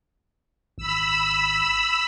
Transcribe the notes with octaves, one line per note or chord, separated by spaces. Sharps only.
G#1 B5 E6